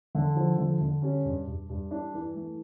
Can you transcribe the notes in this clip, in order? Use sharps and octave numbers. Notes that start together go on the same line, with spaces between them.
D3
F3
D3
D3
G3 C#4
G2
G2
G2
E3 D4
E3
A3